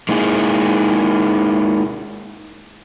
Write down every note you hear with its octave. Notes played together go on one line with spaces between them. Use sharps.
G#3 A#3 D#4 E4 G#4